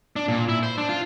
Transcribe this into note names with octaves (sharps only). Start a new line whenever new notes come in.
D4
A#2
E4
C5
D4
F4